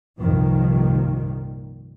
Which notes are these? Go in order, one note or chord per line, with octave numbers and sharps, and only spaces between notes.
C2 G2 A#2 D#3 F3